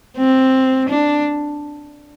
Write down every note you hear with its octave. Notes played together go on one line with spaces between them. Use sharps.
C4
D4